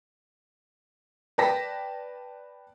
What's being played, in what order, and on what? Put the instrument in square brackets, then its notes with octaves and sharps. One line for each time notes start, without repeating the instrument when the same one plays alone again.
[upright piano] B4 D5 G5 A5 A#6 B6